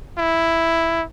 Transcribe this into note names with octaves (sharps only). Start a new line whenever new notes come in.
E4